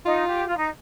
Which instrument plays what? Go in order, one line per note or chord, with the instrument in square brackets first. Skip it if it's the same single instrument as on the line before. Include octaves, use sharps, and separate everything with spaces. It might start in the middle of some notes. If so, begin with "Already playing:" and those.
[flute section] D#4 [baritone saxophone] F4
[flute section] G4
F4
D#4